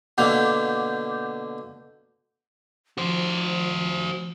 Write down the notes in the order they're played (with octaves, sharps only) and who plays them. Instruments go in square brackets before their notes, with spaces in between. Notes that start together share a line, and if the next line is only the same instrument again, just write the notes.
[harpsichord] B2 D3 A#3 [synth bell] F#5 D6 G6
[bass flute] F3 [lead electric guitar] F#4 C5